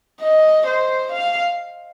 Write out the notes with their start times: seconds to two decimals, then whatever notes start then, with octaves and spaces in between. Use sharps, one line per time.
0.20 D#5
0.67 C5
1.12 F5